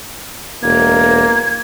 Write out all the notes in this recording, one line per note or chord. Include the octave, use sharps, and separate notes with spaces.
E1 A#3 G#6